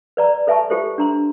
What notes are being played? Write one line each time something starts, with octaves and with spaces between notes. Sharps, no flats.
B4 D5 A#5
A4 B4 E5 G#5 A5 C#6
F4 G4 A4 B4 C5
D4 A#5 C6